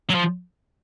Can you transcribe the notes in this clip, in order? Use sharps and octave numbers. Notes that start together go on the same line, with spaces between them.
F#3
F3